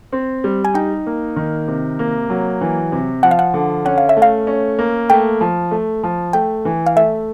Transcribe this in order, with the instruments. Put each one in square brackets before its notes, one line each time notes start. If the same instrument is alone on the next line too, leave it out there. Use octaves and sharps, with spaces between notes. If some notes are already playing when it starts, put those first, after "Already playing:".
[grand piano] C4
G3
[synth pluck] G#5
[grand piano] D#4 [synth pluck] G5
[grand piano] A#3
D#3
C3
A#3
F#3
E3
C3
[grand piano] F3 [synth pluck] F#5
[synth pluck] F5
F#5
[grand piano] D3
[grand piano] C#4 [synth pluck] F#5
[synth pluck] F5
E5
[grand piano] A3
[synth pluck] F5
[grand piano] C#4
A#3
[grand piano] A3 [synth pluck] G5
[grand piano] F3
A3
F3
[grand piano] A3 [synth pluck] G5
[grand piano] E3
[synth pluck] F5
[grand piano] A3 [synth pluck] E5